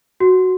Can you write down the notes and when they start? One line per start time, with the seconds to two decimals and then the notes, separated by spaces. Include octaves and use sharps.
0.20 F#4